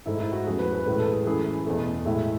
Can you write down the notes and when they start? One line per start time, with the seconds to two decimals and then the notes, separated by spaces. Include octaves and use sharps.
0.06 G#2 D#3 A3 E4
0.20 E4
0.32 F#4
0.47 E2 C#3 F#3 A3 G#4
0.59 B4
0.73 B4
0.86 A2 E3 G#3 B4
0.99 A4
1.13 G#4
1.26 F#2 E3 A3 G#4
1.66 E2 B2 A3
2.06 A2 G#3 E4